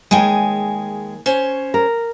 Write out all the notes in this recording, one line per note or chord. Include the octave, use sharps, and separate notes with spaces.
D#2 G#3 G#4 G5 G#5
C#4 C5 C#5
A#4